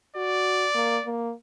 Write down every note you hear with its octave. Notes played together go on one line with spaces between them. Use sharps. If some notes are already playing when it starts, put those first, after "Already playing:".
F#4 D5
A#3
A#3